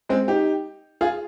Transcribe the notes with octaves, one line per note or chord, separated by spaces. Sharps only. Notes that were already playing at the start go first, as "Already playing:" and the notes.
G#3 C4
D#4 G4
F4 G#4